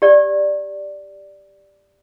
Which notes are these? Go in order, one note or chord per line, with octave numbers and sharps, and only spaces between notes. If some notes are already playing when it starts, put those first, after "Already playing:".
G4 D5